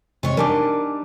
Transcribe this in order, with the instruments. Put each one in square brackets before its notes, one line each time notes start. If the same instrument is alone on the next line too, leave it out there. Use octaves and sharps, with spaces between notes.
[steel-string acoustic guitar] C3 C#5 D#5
[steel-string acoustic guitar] G3 D4 D#4 [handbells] A#4 G#5 D6